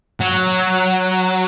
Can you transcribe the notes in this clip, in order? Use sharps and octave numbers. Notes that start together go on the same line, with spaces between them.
F#3